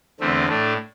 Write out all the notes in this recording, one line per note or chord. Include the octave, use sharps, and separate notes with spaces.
E2 D3 A3 C4
A2 A3 D4